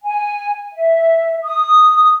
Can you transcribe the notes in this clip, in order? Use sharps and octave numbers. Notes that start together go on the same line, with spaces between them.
G#5
E5
D#6